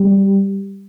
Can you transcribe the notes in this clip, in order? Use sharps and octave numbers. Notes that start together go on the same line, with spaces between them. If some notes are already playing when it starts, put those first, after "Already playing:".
Already playing: G3